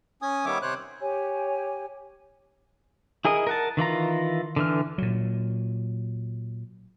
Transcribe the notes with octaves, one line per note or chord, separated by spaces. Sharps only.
C#4 G#5 D#6
D#3 G3 B3 C#5 E5 D6
C3 C5 C#5 F#6
G4 C#5 G#5
E4 G#4 A#4 D#5
A#4 F#5 A5
D#3 E3 F4 A#5
D3 E3 F6
A#2 F#3